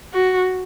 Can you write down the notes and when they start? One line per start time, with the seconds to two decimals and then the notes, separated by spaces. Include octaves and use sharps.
0.13 F#4